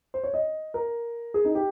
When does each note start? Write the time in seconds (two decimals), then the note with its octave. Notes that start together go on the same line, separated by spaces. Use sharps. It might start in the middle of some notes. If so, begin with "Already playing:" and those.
0.14 C5
0.24 C#5
0.34 D#5
0.74 A#4
1.34 G#4
1.45 D#4
1.55 G4